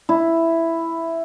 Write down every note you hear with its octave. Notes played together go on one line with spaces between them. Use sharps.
E4